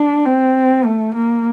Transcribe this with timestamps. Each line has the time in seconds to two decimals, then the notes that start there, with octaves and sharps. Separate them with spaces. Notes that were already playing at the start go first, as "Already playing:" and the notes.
Already playing: D4
0.25 C4
0.85 A3
1.15 A#3